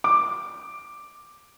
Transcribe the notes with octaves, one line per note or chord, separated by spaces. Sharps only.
D6